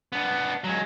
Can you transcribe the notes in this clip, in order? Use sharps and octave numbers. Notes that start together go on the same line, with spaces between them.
B3 D4
F#3 G#3